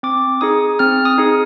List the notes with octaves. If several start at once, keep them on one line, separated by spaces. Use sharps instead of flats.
C4 D6
D#4 G#4 D#6
C4 F6
D#6
D#4 G#4